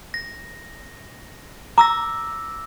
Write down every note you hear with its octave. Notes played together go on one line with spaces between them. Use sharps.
A#6
A#5 D6 E6 A#6